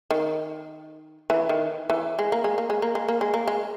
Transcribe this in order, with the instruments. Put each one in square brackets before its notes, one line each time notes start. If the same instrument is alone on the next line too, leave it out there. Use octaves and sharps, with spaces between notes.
[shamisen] D#3
E3
D#3
E3
G#3
A#3
G#3
A#3
G#3
A#3
G#3
A#3
G#3
A#3
G#3